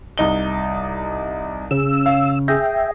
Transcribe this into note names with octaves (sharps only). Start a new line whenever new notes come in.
C2 D#4 G7
C#3 E6
F5
G#4 E5 G5 A#6